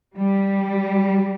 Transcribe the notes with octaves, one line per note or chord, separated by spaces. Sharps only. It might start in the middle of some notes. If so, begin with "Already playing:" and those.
G3